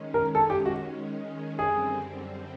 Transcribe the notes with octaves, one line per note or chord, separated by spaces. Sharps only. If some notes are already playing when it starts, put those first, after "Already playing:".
Already playing: D#3 G#3 C#4
A#4
A4
G4
F#4
F#2 D3 G3 C4 G#4